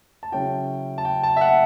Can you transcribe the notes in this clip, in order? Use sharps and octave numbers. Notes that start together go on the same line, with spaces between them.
A5
C#3 F#3 C#4 E4 G5
A5
G5
A5
E5
F#5